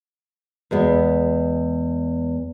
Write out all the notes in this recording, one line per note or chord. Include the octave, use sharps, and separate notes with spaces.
E2 G#3 B3